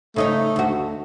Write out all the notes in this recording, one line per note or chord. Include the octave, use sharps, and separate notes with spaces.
C#3 A3 D#4 C#5
D2 F#4